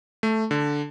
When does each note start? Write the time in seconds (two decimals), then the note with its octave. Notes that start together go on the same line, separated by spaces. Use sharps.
0.23 A3
0.51 D3